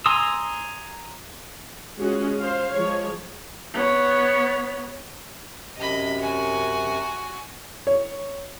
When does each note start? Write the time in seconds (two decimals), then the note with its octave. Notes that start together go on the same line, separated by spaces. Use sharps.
0.06 G#5 A#5 C6 D#6 E6
1.99 G#3 C#4 F4 F#4 G#4
2.42 C5 F5
2.72 F3 G#3 C#5
3.74 B3 C#5
5.77 F#2 C3 D#5 B5
6.19 F#4 G#5
7.87 C#5